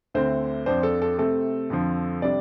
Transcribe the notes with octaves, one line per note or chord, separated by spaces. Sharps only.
D2 D3 A3 C4 C5
F2 F3 D4 C5
A4
A4
C3 A3 C4 A4
F2 D3 F3
C3 G3 D4 D5